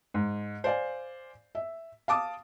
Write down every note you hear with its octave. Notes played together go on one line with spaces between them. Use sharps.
G#2
C5 D5 F5 G#5
E5
F5 A5 D6 D#6